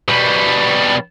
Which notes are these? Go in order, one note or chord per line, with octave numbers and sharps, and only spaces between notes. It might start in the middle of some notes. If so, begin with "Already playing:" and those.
B2 G3